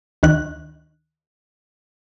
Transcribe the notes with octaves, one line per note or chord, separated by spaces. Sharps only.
D2 D#3 F#6